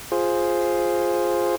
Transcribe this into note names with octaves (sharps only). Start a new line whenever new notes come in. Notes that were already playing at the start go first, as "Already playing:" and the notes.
F4 G#4 C5